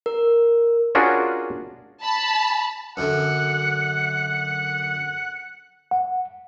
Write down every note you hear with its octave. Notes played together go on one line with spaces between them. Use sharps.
A#4
C#4 D4 F4 F#4 G#4 A#4
A5 B5
F#2 D3 F#5
F#5